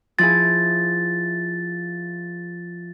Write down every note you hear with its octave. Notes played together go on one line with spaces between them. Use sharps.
F3 E4 G#4 A6